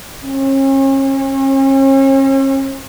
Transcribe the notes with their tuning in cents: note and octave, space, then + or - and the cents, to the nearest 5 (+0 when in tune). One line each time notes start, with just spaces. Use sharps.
C#4 -40